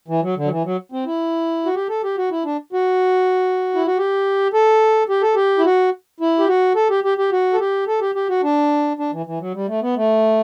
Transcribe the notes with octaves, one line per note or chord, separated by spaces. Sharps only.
E3
F#3
D3
F#3
E3
F#3
C4
E4
F#4
G4
A4
G4
F#4
E4
D4
F#4
E4
F#4
G4
A4
G4
A4
G4
E4
F#4
E4
G4
F#4
A4
G4
G4
G4
F#4
A4
G4
A4
G4
G4
F#4
D4
D4
E3
E3
F#3
G3
A3
B3
A3